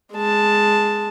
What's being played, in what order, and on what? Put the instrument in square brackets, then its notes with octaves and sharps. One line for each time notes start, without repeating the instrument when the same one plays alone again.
[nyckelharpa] G#3 A5